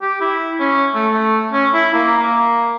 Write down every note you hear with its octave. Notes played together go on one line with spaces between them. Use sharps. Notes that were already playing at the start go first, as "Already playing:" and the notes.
G4
E4
C#4
A3
A3
C#4
E4
A#3
A#3